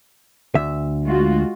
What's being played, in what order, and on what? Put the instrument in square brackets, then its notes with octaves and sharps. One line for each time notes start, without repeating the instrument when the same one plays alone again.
[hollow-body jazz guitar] D2 E5
[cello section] G#3 F4 F#4